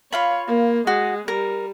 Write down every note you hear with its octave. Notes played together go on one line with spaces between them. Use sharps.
F4 C#5 F5 B5
A#3
G#3 F#4
G3 A#4